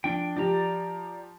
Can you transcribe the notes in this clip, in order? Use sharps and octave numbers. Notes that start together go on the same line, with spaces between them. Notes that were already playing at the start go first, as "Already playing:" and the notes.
F3 D4 G5
F3 G4 D5 A#5